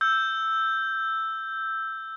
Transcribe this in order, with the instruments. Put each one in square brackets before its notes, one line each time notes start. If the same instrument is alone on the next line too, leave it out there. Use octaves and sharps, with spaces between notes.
[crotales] E6 G6